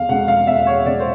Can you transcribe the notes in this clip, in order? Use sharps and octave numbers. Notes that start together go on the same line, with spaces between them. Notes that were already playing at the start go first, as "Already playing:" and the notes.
Already playing: E2 F5
B2 G#3 C#4 F#5
F5
E2 E5
C#5
B2 G#3 C#4 D5
C5